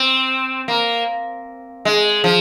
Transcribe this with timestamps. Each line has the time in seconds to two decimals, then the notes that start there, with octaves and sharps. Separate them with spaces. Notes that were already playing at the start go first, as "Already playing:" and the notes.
Already playing: C4
0.68 A#3
1.85 G#3
2.24 F3